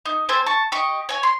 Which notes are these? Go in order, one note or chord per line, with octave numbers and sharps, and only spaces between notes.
D#4
C4 A4 C5 G#5
A5 C#6
G4 D#5 C#6
C#5 G#5
C6